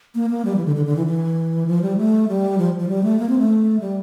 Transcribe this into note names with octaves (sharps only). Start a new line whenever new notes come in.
A#3
A#3
G3
E3
D3
D3
D3
E3
E3
F3
G3
A3
G3
F3
F3
G3
A3
A#3
C4
A3
G3